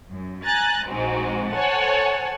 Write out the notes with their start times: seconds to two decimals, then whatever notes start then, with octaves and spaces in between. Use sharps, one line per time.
0.11 F#2
0.45 G#5 A#5 F#6 A6
0.88 A#1 G#2 G#3 C4 F#4
1.53 A4 C5 C#5 F#5 G#5 A5